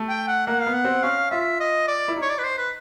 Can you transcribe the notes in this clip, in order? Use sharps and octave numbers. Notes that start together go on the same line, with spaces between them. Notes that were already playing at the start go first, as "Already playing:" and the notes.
Already playing: A3
G5
F#5
A#3 F#5
F5
B3
F#5
C4
C#4 F5
F4 E5
D#5
D5
E4
D#4
C#5
D5
B4
C5
B4